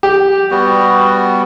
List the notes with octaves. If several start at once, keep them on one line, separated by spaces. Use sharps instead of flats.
G4
G3 B3 F#4